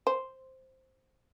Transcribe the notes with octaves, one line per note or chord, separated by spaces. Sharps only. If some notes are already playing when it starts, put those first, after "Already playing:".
C5